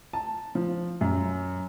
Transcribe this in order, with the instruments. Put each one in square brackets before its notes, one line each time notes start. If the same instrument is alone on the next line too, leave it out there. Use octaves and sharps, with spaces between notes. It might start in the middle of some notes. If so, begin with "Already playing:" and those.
[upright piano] A5
F3
F#2